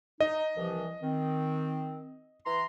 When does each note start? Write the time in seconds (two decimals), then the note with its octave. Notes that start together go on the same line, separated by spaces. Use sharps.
0.20 D#4 D#5
0.57 C2 E3 F3
1.03 D#3 C4
2.46 E3 A#5 C6